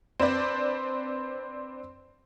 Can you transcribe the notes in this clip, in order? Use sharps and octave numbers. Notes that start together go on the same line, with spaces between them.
C4 D4 B4 C5 D5